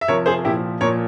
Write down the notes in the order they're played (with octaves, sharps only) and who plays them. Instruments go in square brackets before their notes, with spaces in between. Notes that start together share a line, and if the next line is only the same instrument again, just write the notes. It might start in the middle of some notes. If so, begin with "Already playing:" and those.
[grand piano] E5
C3 F3 A#4 C#5
G#4 C5
A#2 F3 E4 G4
A#2 F3 A#4 C#5